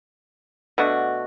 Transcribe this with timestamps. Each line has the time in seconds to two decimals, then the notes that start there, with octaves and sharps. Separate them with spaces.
0.78 B2 A3 D4 F#4